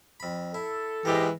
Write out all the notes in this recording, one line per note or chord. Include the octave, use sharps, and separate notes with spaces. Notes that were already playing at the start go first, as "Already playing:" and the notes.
F2 B5
E4 A4
G#2 E3 G#3 A#3 G4